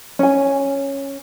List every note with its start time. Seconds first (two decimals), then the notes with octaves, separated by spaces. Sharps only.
0.19 C#4 G#5